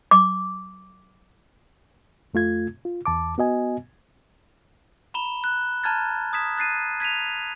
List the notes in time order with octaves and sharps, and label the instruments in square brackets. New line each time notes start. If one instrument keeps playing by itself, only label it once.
[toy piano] D6
[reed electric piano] F2 A3 F4 G#6
F4
E2 A5 D6
B3 F#4 D#5 G#5
[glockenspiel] A#5 B5 E7 G7
F#6
A5 A#5 F6 G#6 A6
D#6 G#6 B6 E7
F#6 A6 C7 D#7
G#6 B6 D#7 F7